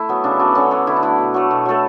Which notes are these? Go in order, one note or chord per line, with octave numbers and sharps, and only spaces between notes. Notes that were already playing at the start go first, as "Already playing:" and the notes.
Already playing: A3 E4
F#3 B3
C#3 D4
F#3 B3 D4
D3 C#4
A3 D4
D3 E4
D4
A3 E4
B2
F#3 A3
B2
F#3 A3 A4